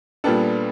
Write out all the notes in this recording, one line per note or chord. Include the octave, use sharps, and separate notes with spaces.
A#2 G3 B3 D4 A4